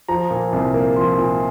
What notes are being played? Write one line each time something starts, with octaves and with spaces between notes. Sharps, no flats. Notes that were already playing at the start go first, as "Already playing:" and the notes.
F3 A#5
A#2
C2
A#3
F3 C6
A#2